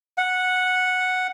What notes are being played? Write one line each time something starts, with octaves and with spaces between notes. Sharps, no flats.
F#5